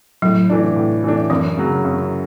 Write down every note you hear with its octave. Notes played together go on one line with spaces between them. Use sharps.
A2 F#3
E3 A3 D4
A2
E3 A3 D4
F#2 E3
C#3 F#3
F#2